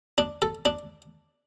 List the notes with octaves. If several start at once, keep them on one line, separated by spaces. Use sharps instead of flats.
D4
A4
D4